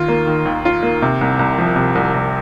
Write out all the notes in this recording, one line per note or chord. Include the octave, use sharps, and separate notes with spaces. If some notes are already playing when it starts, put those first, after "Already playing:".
Already playing: D#2 D#3 F4
A#3
D#3
D#2
F4
A#3
C3
C2
C2
F3
C3
C2
C2